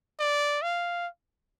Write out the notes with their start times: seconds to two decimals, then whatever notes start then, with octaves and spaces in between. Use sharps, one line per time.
0.20 D5
0.62 F5